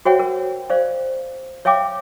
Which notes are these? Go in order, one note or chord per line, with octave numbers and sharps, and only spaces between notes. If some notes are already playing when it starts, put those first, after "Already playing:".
F#4 C5 C#5 E5 F#5 G5
A#4
C5 D5 F5
C#5 E5 F5 G5 D6